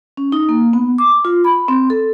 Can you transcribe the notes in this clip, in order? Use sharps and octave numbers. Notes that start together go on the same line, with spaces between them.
C#4
D#4
A#3
B3
D6
F4
B5
C4
A4